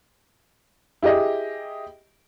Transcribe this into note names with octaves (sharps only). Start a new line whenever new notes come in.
E4 G4 G#4 D#5